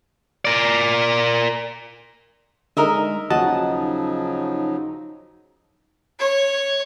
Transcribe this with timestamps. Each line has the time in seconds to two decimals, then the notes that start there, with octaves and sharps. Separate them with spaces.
0.45 A#4 D5
2.77 D3 G#3 D#4 A#4 D#5 E5
3.30 D#2 C#3 F3 F#3 F#4 D#5 F#5 A5
3.46 D#4
6.19 C#5